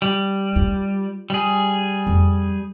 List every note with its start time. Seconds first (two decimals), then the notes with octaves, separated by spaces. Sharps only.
0.02 G3
0.56 F4
1.30 G3 G#4
2.07 F2